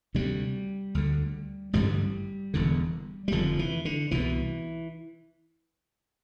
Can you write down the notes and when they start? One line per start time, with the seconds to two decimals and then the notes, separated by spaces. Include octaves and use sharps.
0.15 D2 C3 G3
0.95 D2 D3
1.73 A1 G2 D3 G3
2.54 E1 E2 D3
3.28 G3
3.32 F1 F2 D3 F3
3.59 E3
3.85 D3
4.11 C2 B2 E3